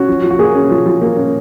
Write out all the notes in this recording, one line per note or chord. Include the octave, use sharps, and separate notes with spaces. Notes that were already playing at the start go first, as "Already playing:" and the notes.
Already playing: C#4 F#4
F3
F3
F#4
A#3 G#4
C#4
F3
F3
A#3
C#4